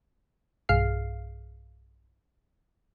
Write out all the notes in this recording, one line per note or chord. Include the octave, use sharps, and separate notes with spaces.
B1 G2 G#4 F5 F6 C7